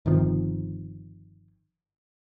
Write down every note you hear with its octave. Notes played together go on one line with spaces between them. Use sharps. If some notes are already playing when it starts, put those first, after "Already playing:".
G1 C3 D#3 F3